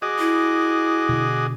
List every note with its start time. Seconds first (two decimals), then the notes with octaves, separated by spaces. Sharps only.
0.02 F#4 G#4 D#5 D6 D#6
0.18 E4
1.09 B2 D3